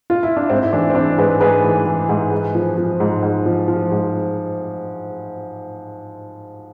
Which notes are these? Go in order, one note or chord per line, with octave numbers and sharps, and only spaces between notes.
F4
E4
D4
G#2 C4
E4
E3 D4
C4
E3 D4
G#2 G#4 B4
G#2 G#4 B4
E3
E3
G#2
G#2
F3
F3
G#2
G#2
F3
F3
G#2